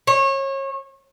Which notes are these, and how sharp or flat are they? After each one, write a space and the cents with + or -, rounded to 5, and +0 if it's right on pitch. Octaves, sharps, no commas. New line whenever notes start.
C#5 -30